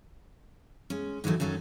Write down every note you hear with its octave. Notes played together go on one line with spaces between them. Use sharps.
G#3 C#4
G#2 D#3 E3 F#3 A3
F#2 D#3 F#3 C#4 A4